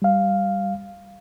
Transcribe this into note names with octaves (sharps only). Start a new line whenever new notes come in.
G3 F5